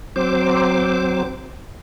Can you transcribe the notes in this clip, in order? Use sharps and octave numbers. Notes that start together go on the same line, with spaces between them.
F#3 C4 C5 D6